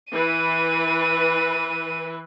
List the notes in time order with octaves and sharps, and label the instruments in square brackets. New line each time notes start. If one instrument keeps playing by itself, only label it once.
[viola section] E3 B4 [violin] D#7